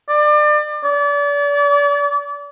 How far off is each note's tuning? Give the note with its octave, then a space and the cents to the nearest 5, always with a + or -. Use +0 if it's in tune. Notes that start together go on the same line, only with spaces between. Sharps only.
D5 +30
D5 -35